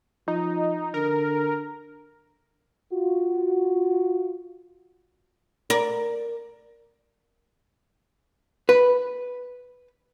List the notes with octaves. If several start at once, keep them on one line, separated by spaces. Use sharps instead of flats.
F3 D#4
D3 A#4
F4 F#4
A#4 D5
B4